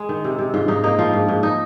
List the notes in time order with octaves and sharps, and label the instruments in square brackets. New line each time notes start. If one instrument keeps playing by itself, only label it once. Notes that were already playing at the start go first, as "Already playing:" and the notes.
Already playing: [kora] G#3
D#3
C3
C3
G#2 F4
G#2 D#4
A#3 D#4
F3 F4
G#2
G#2
D#4